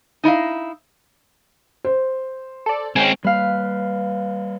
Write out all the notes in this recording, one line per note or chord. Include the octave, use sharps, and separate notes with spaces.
D#4 E4 D#5 F5
C5
A4 D5
G#3 C4 C#4 G5 G#5
G3 A#3 B4 F5